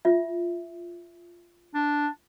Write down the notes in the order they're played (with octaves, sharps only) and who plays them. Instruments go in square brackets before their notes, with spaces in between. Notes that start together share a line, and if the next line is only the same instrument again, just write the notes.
[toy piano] F4 E5
[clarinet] D4